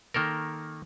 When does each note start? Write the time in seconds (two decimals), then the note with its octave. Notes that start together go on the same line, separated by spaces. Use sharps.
0.14 D#3 A#3 A4 A#4